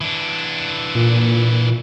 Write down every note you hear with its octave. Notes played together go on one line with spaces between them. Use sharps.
E3 D4
A#2